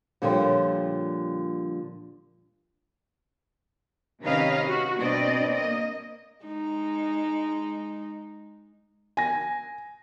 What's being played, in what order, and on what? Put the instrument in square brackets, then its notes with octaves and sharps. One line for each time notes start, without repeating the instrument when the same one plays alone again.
[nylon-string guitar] A#2 D3 F3 G3 C#5 G5
[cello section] C3 D#3 C#4 B4 D#5 F5
F#4
B2 B3 C4 D4 D5 D#5
A#3 D#5
[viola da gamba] G#3 D#4
[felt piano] G#5 A#6